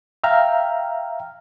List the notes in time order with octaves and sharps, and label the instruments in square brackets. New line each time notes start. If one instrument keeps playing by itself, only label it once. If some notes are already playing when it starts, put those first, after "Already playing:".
[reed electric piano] E5 F5 G5 A#5 F6